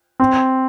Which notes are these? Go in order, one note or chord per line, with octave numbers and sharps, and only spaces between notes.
C4